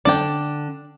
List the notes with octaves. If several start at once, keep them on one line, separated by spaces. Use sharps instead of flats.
D3 D4 D5 G5